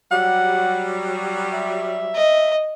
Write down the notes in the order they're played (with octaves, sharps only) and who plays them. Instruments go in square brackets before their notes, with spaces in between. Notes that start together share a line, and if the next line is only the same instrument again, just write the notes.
[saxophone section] F#3 G3 [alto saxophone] F#5
[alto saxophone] E5
[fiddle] D#5